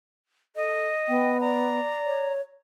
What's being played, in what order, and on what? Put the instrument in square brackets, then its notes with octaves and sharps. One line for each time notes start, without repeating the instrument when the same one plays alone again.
[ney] A4 [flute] D#5
[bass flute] B3 [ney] G5
[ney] D5 [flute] A#5
[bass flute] C#5